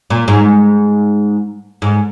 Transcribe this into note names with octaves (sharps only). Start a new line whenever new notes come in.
A#2
G#2
G#2